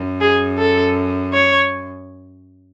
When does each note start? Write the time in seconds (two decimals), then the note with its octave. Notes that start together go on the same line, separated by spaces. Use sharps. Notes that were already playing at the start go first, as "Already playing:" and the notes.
Already playing: F#2
0.21 G#4
0.59 A4
1.33 C#5